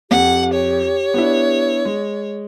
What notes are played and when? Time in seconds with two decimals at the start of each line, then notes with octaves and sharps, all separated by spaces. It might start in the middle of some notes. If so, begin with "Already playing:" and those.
0.11 F2 G4 F#5
0.54 C#5
1.14 B3 D4 E4
1.85 G#3